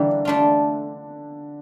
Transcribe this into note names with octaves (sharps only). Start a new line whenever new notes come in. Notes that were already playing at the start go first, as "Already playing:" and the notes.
Already playing: D3 E3 G3 A#3 D4 E4 G4
A3 D4 F4